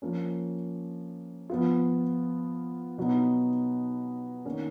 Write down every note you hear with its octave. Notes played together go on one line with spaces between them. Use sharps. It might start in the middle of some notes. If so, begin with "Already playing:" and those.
F3 A#3 C#4
F3 B3 F4
B2 F#3 B3 D#4
D#3 A#3 C#4